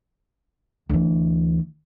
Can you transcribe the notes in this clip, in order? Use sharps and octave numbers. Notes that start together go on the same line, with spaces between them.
D2 E3